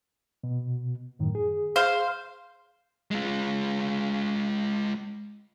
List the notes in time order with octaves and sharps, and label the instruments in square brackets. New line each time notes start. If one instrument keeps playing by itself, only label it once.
[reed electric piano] B2
F#2 A2 D#3
G#4
[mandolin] C5 F5
[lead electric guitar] G#3 F4